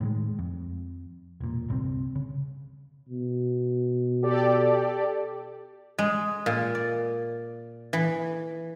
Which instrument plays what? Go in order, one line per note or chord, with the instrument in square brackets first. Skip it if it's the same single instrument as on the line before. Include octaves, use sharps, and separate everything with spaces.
[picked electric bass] A2 D#3 G3 G#3
F2
E1 A#2
G1 C2 B2 C4
C#3
[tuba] B2
[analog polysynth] G4 A4 D5
[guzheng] G#3
A#2
D5
E3